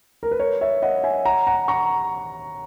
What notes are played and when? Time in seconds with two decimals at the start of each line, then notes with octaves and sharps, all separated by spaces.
0.23 A#4
0.31 B4
0.40 A#4 C#5
0.61 C#5 E5
0.82 D#5 F#5
1.03 E5 G#5
1.25 F#5 A#5
1.47 F#5 A#5
1.68 A#5 C#6